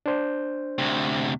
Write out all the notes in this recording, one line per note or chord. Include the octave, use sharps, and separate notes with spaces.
D4 C5 G6
D2 C3